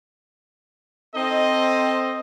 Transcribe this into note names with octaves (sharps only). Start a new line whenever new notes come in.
C4 A4 C5 D#5